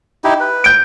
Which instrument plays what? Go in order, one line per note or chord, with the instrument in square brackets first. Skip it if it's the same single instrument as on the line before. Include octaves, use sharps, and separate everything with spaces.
[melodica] D#4 E4 G4
B4
[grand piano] G6 D7